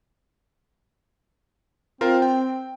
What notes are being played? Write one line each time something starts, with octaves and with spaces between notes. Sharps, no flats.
C4 F4 A#4 C5
G5